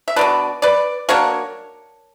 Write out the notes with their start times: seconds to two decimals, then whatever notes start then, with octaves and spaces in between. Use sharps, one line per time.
0.08 E5
0.16 B2 A#3 D4 B4 D5
0.62 B4 D5
1.09 F#3 A#3 D4 A#4 C#5